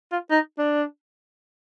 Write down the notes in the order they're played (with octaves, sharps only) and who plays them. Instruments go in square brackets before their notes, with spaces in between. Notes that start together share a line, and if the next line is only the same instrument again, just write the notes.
[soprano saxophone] F4
D#4
D4